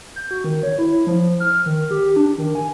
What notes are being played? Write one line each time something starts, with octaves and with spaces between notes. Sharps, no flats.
G6
F#4
D#3
C#5
E4
F3
F6
D#3
G4
D4
D#3
G#5